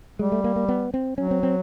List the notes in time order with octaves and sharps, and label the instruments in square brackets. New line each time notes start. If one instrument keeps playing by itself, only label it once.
[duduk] G3 [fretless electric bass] G#3
[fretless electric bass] A3
A#3
A#3
B3
C4
[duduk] F#3 [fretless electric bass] C#4
[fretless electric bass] C4
C4